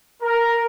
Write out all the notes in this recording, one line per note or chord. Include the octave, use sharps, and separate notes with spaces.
A#4